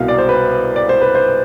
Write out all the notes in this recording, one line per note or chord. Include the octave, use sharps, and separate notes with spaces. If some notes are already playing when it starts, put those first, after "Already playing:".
Already playing: C2 B2 F5
D5
C5
B4
D5
C5
B4
C5